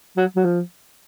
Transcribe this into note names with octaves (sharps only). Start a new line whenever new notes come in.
F#3
F#3
F3